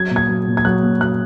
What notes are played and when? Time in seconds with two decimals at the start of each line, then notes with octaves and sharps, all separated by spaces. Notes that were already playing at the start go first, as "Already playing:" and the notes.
Already playing: F#3 G#6
0.11 A#2
0.16 G#6
0.29 F#3
0.47 A#2
0.57 G#6
0.65 F#3 F#6
0.83 A#2
1.01 F#3 F#6